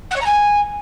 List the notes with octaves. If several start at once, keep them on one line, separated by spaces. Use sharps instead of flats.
F#5
C#5
A#5
G#5